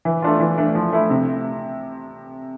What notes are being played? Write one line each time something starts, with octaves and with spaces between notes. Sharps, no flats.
E3
A3 D4 F4
E3
A3 D4
F3
A3 E4
C3